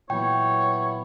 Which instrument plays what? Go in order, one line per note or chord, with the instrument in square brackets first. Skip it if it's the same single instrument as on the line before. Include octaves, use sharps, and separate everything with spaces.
[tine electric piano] A#2 E3 F#3 [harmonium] B3 E4 [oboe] C#5 [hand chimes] G5